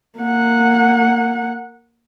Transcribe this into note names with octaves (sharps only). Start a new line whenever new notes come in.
A#3 F#5